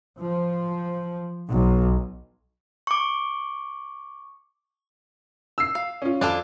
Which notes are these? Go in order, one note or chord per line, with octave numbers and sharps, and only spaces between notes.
F3
B1
C#6 D6
E6 C7
F5
C#4 F4
F2 D4 F4 A4